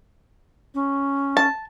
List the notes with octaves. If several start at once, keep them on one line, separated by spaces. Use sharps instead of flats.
C#4
A5